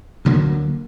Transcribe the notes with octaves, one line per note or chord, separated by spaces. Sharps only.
D2 D3 F#3 A#3